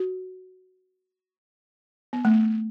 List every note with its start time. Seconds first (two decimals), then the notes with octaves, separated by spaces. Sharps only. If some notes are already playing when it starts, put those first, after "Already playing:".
Already playing: F#4
2.13 B3
2.25 A3